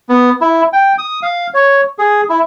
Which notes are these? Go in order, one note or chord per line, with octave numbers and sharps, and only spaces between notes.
B3
E4
G5
D#6
F5
C#5
G#4
E4